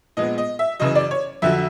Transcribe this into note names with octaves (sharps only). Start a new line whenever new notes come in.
A#2 F3 G#3 B3 D#5
D#5
E5
F#2 C#3 E3 D#5
D5
C#5
F2 D3 F#3 E5